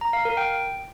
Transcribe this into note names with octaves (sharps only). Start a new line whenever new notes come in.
A#5
F5
A#4
G5